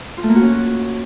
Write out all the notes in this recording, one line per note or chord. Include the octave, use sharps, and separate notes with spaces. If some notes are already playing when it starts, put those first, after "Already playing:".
F4
A3
A#3
F#4
C#4